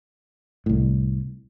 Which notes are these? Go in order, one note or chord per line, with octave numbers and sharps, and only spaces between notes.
C2 A2